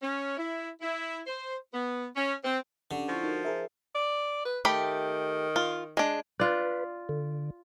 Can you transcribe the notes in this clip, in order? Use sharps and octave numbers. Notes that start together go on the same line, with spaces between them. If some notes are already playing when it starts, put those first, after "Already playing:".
C#4
E4
E4
C5
B3
C#4
C4
D3 C#4 D4 G4
F3 E4 F4 C#6
D#4 F#4 A#4
G#4 A#4 C5 E5
D5
B4
D#3 A3 G4 B5
F4
G#3 D4
F4 B4 D5
D3